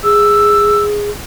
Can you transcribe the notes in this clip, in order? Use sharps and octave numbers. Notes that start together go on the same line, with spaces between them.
G#4 E6